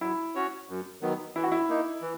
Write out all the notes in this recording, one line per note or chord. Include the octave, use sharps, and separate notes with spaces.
F#3 E4
C#4 F#4 C#5
F#2
D#3 F#3 B3
E3 E4
F#4
E4
A#3 D#4
E3